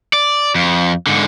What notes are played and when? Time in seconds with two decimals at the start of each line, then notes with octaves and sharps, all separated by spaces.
0.13 D5
0.55 F2
1.07 G#2 D3